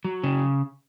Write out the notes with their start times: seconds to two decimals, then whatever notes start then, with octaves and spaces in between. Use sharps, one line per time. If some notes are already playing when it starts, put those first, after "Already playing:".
0.05 F#3
0.23 C#3